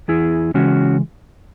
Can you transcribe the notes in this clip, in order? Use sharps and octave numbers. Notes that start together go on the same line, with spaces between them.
E2 E4 G#4
C#3 E3 G#3 C#4 F#4